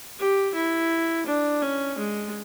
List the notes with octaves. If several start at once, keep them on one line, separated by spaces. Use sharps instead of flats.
G4
E4
D4
C#4
G#3